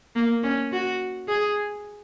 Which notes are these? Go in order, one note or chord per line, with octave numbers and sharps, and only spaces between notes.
A#3
C#4
F#4
G#4